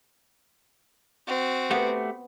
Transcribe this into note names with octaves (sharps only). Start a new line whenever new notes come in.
C4 F#4
A3 B3 G4 F#5